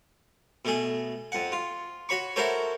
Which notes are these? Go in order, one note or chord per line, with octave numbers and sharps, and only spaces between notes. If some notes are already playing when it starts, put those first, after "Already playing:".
B2 A3 G#4
F2 F#5
F4
F#4 C#5 B5 C#6
E4 F#4 A4 A#4 C5 C#5